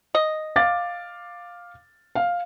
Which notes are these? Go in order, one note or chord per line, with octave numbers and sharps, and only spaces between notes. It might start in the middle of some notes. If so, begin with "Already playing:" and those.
D#5
F5 D6 A6
F5